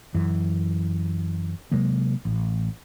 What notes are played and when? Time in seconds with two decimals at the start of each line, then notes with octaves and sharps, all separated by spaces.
0.14 F#2 E3
1.72 C3 F#3 G#3 A#3
2.25 A1